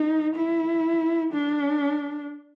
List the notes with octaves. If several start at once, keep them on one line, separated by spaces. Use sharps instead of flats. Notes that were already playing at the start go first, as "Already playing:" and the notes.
Already playing: D#4
E4
D4